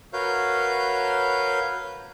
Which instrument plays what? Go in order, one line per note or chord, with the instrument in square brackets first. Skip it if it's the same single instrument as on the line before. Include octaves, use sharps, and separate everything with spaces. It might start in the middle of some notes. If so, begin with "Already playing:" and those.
[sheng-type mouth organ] F#4 A#4 B4 C#5 F5 G6